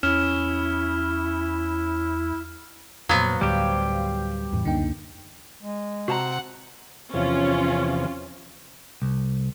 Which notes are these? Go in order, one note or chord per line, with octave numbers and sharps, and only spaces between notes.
E2 C#4 E4 F6 E7
F2 A#2 F#3 B3 C5 F5
D2 A2 G3 G4
E2 A2 E3
C#2 F#2 D3 A#3 D#4 G5
G#3
C3 F#4 F#5 A5 A#5
E2 C3 F3 C#4 F4
C2